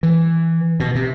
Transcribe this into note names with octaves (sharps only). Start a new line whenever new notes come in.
E3
B2
C3